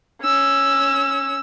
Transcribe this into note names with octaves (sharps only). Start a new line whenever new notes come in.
C#4 E6